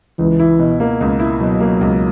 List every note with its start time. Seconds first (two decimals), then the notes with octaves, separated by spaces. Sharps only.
0.19 C#2 E3
0.40 E4
0.59 B2
0.80 A#3
1.01 C#2
1.20 E4
1.40 B2 F#3
1.60 A#3
1.81 C#2